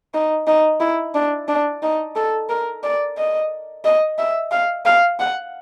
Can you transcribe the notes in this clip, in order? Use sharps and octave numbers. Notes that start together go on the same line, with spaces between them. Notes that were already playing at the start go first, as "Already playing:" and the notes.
D#4
D#4
E4
D4
D4
D#4
A4
A#4
D5
D#5
D#5
E5
F5
F5
F#5